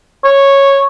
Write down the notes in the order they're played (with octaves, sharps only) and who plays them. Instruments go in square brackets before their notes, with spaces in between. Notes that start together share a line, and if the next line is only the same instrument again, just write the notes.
[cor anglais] C#5